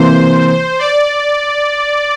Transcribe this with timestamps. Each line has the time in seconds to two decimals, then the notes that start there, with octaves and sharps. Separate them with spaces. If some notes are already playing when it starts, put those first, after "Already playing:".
Already playing: C3 E3 A#3 C5
0.79 D5